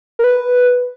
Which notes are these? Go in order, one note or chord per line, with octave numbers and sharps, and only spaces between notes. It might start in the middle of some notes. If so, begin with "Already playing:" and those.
A#4
B4